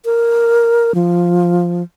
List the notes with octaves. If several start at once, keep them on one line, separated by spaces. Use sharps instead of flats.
A#4
F3